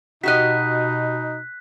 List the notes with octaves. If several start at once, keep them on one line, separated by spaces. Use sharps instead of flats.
B2 D#4 F#4 G4 D#5 F#6 B6